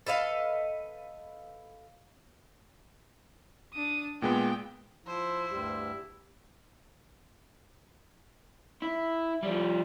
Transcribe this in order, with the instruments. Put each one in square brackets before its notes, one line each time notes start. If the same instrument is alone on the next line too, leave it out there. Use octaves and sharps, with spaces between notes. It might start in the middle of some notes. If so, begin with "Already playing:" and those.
[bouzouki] A4 B4 D#5 F5
[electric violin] D4 D#6
[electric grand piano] A#2 G#3 B3 [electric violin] G5
[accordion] F3 [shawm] E4 [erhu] C5
[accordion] D2 G2 G3 [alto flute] G4
[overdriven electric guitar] E4
F3 G3